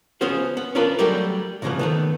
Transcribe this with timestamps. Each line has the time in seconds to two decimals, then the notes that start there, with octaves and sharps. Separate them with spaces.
0.21 B3 C#4 F4 G#4 C5 F5
0.57 B3
0.75 C#4 D4 F4 A#4 B4 D5
0.99 F#3 G3 A3 G4 A#4 D5
1.62 C2 G#2 C#3 E3 F3 B3
1.79 D#3 A3 B3